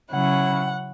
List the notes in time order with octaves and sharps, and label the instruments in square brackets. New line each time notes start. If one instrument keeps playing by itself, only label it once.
[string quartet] C#3 F#3 C#4 E4 F#5